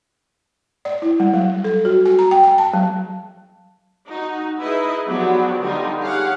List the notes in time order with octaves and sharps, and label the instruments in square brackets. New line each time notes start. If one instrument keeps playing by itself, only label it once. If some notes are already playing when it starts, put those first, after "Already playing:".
[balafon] D5
E4
G3
F#3
A4
F#4
G#5
A#5
G5
G#5
A5
F#3
[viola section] D#4 F#4
D#4 E4 G#4 B4 D#5 E5
F3 F#3 B3 D4 F#4 G4
D3 G3 D#4 F4
G4 G#4 C#5 F5 F#5